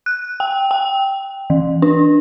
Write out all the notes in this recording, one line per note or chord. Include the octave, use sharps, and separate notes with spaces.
F#6
G5
G5
E3
D4